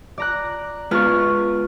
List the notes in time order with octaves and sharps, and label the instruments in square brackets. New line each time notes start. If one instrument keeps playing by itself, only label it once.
[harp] D5 A#5 F#6
[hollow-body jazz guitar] G#3 B3 F4 [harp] C#6 F6